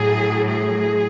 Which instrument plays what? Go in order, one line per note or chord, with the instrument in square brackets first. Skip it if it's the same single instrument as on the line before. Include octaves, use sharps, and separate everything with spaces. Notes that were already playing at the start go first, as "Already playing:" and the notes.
Already playing: [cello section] A2 F#3 G#4
G#4